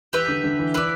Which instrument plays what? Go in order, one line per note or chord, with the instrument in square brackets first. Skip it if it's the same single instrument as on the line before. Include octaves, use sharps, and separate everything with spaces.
[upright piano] E3 [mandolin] G4 B4 E5
[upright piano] D3
D3
E3
[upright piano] E3 [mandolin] E4 B4 D5